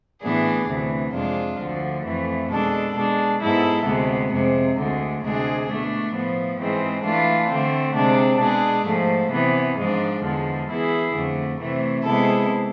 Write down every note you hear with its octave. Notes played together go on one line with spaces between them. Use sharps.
A2 E3 B3 D4 G#4
D2 C3 E3
F2 C3 G#3 D4 F4
D2 D3 F3
F2 E3 A3
B2 G#3 D4 A4
B2 G#3 D4
G#2 G#3 B3 E4 A4
D2 C3 G#3 B3
F2 C3 G#3
D2 D3 G#3
D2 C3 G#3 D4 G#4
B2 A3 D4
A2 F3 B3
G#2 E3 G#3 C4
E3 A3 D4 F4
D3 A3 C4
C3 G#3 D4
B2 G#3 D4 G#4
G#2 F3 A3
C3 E3 B3
G#2 F3 G#3 D4
E2 D3 F3 G#3
E3 B3 E4 G#4
F2 D3 A3
C3 E3 A3
C3 G#3 B3 E4 A4